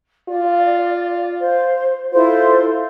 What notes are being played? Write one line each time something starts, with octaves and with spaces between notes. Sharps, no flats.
F4 D5
C5
E4 F4 A4 C5 C6